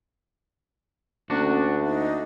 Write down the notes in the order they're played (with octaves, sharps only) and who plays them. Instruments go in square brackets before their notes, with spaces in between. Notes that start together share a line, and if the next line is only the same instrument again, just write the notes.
[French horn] D2 [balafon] A#3 C#4 A4 [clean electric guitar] D4 F#4
[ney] D#4